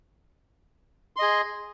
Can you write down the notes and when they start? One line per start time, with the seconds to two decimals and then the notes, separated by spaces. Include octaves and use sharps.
1.16 C6
1.19 D#5
1.22 G#4